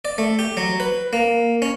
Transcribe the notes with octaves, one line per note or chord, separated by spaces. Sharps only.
D5
A3
G4
F#3
B4
A#3
C#4